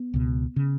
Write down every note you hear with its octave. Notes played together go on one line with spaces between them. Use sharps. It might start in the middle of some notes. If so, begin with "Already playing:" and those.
Already playing: B3
C#2 B2
C#3